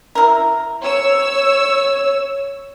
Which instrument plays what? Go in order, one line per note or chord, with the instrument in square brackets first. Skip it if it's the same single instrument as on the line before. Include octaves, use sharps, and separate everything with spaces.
[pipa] E4 A#4
[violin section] C#5 E6